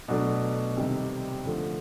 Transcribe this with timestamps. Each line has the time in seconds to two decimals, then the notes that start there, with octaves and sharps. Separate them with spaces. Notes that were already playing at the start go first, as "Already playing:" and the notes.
0.08 B2 F#3 A3 D4
0.77 C3 D#3 G3 C4
1.46 D3 F3 A3